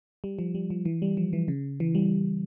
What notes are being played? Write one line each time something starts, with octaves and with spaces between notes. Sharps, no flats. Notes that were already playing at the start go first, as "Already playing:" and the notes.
G3
F3
G3
F3
E3
G3
F3
E3
C#3
E3
G3